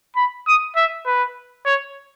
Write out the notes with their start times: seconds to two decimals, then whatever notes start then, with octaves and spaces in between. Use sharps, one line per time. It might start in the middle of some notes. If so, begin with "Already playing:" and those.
0.16 B5
0.47 D#6
0.76 E5
1.06 B4
1.66 C#5